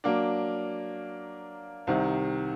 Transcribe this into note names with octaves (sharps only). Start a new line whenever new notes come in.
F#3 A#3 D4
C2 C3 D#3